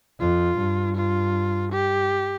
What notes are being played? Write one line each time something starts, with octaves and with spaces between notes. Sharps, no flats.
F2 F4
G2
F4
G4